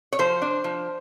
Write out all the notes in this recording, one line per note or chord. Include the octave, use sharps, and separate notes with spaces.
C#5
F3 C5
D4
F3